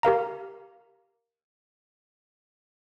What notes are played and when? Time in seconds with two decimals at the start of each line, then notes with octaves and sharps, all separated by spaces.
0.03 G4 A#4 F5 A#5